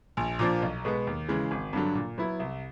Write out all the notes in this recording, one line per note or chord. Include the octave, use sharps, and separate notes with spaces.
A#1
A#2 F3 A#3 D4
B1
B2 G#3 B3
D#2
C#3 E3 G#3
G#1
G2 D3 F#3
A#2
F#3 B3 E4
C2